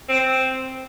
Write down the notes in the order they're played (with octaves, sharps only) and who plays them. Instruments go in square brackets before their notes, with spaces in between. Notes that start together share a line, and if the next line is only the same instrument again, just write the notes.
[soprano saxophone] C4